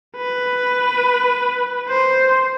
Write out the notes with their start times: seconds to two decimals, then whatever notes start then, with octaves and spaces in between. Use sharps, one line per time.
0.17 B4
1.88 C5